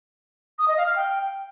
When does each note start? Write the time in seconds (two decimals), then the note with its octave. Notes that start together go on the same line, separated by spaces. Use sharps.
0.59 D#6
0.68 D#5
0.77 F5
0.87 F6
0.96 G5